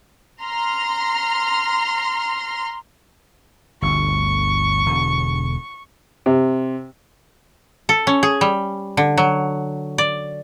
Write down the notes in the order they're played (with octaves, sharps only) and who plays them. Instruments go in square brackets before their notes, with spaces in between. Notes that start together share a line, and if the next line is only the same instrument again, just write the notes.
[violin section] A#5 C6 F6
[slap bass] G1 D2 [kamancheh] C#6
[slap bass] E1 D3
[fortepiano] C3
[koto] A4
C#4
G#4
G3
D3
F#3
D5